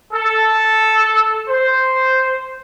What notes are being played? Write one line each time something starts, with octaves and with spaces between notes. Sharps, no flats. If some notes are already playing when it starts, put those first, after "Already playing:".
A4
C5